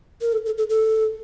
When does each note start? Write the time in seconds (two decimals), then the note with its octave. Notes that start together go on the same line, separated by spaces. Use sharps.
0.21 A#4
0.32 A4
0.46 A4
0.58 A4
0.70 A4